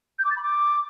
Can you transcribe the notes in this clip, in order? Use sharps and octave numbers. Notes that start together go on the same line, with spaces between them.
G6
D6
A6
B5
D6